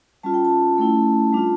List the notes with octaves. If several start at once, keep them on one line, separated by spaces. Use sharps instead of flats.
G3 C#4 F4 A5
G5
A5
A3 C#4 E4
G3 D4 F4